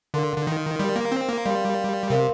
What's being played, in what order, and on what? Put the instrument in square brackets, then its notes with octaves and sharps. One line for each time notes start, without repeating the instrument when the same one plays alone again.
[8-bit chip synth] D3 [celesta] A#4 F5 C6
[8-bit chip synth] D3
D#3
[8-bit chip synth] G3 [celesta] A#4 F5 C6
[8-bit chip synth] A#3
C4
A#3
[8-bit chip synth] G3 [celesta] A#4 F5 C6
[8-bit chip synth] C3 [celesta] A#4 F5 C6